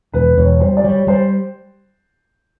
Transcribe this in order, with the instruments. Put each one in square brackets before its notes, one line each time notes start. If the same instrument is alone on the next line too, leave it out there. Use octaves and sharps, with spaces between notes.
[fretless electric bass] E1 [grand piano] B4
[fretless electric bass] E1 [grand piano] C#5
[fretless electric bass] G3 [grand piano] C5
[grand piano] D5
[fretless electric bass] G3 [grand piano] C#5
[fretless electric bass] G3 [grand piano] C5